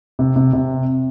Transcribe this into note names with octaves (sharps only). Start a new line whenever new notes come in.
C3
C3
C3